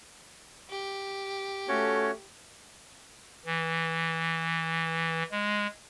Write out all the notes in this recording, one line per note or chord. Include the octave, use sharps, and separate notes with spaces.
G4
A3 C#4 F#4 C#5
E3
G#3